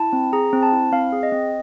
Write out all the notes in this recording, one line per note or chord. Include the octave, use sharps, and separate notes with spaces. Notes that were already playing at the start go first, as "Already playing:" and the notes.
Already playing: E4 A5
C4
G#4 A#5
C4
A5
E4
C4 F5
G#4
D#5
C4